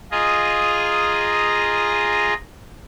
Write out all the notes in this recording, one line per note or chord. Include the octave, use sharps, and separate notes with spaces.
F4 G#4 D#5 A#5